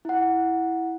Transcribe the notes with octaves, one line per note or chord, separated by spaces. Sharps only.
E4 F#5